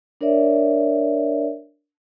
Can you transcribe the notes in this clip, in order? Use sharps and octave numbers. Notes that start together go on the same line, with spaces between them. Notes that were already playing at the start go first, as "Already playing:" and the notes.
D4 A#4 C#5 D5 E5